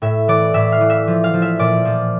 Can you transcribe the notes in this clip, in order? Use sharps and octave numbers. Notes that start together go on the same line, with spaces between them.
A2 E5
E3 D5
A2 E5
F5
E3
E5
F3
F5
F3
E5
A#2 D5
F3